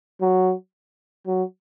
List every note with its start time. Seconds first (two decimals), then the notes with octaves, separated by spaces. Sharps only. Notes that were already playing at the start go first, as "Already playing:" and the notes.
0.21 F#3
1.27 F#3